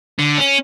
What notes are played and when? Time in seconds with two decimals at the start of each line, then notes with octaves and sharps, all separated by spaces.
0.19 D3
0.38 C#4